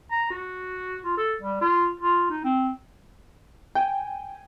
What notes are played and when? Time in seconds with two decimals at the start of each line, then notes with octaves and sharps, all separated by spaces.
0.11 A#5
0.30 F#4
1.04 F4
1.17 A4
1.42 G3
1.61 F4
1.99 F4
2.30 D#4
2.44 C4
3.75 G5 G#5